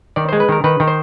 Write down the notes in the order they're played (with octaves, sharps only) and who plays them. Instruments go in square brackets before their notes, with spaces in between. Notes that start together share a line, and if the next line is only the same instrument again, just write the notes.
[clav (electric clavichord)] D#3 D5
C5
G#3
B4
D#3 A#4
D#3 B4
D#3
C5